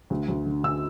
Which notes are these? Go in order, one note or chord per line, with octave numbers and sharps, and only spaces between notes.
D2
D2
D3
D3 E6